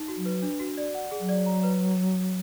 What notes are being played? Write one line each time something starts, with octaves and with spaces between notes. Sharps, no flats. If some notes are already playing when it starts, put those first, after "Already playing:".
Already playing: D#4
F#4
F#3
B4
D4
F#4
D5
F#5
G#4
F#3
D5
A#5
B4